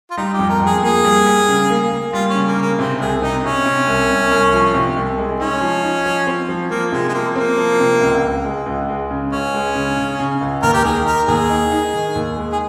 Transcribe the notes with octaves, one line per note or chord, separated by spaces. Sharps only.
F4
G3 D#4
G4
F2
A#4
F2
G#4
A#3 G#4
G3
G3
C#3
A#3
A#3
G3 F4
C#4
C#3
A#3
C#3 A#3
C3 C4
C2 G#4
C3 D#4
C3 C#4
C3
C2
C2
C2
F3
C3
C2
G#3
C#4 D#4
F3
D#4
F3
C4
F3
F3 A#3
C3 G#3
G#3
F3 A#3
A#3 C4
F3
C3
C#2
C#2
G#3
C#2
G#3
C#3
C#2 C#4
G#3
C#3
C#3
C#3
C#2
D#2 A#4
G4
D#3 G#4
D#4 A#4
D#2 G#4
D#4
D#4
D#3
D#2
G#3
G#4